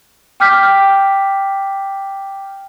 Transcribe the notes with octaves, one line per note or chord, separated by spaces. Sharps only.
G5 D6 F6 G6 B6